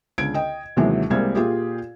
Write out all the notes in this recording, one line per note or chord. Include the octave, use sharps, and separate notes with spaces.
C#2 D3 G#6 D7
D#5 G5
D#2 C3 E3 F#3 G#3
C2 G3 G#3 A#3 C4 G#6
A#2 F4 G4 G#4